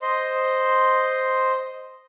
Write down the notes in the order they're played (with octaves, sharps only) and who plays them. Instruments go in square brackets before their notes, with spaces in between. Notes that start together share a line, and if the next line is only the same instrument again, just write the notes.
[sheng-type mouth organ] C5 D#5 C6